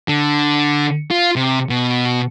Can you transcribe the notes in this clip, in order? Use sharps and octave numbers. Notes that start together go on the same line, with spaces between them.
D3
F4
C3
B2